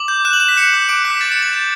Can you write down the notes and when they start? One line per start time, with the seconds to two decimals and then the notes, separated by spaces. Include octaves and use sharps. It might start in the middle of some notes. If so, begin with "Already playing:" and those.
Already playing: D6 F#7
0.08 G6
0.25 F#6 E7
0.33 F#7
0.40 F#6 E7
0.48 B6
0.56 F#6 C#7
0.73 D6
0.89 D6 D7
1.05 F#6 B6
1.21 F#6 A6
1.32 F#6 C#7
1.42 A6
1.53 G6